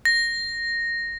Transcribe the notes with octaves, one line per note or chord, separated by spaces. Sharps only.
A#6